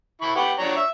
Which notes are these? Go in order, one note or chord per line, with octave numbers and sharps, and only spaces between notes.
E4 B5 C#6
G4 B4 F#5
D4 C#5 A#5
E5